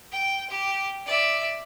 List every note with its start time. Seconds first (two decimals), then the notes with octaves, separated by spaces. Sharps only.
0.12 G5
0.50 G4
1.06 D5 E5